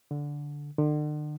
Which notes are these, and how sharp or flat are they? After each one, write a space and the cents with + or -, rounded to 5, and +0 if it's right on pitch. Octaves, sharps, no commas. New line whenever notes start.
D3 -10
D3 +40